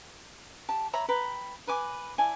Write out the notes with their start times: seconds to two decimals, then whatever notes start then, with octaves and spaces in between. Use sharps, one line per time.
0.69 G4 A5
0.93 C#5 E5 A#5 B5
1.09 B4 G5 A#5
1.67 B4 G#5 D6
2.18 E4 D5 G#5 A5